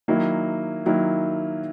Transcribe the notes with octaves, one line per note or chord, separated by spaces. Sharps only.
D#3 F#3 A#3 E4
D#3 F#3 A#3 E4